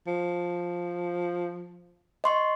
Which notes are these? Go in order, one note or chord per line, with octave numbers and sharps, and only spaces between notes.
F3
D#5 C6 C#6